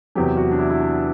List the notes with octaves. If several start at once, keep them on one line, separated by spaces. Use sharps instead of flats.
E2 C3 F#3 G4
F#4
D4
E4
E4
D4